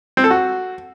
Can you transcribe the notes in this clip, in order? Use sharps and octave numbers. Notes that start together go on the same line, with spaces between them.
C4
A4
F#4